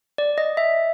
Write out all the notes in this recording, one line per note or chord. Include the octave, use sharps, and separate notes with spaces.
D5
D#5
E5